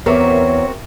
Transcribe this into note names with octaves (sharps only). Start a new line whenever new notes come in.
E2 B3 C4 F#4 A#4 C#5 E5 D6